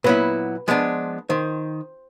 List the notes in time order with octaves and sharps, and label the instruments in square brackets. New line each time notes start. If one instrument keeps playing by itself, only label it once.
[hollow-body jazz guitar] A#2 F#3 B3 E4 [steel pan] B4
[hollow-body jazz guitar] F3 G#3 B3 D4
[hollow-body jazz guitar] D#3 [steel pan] C5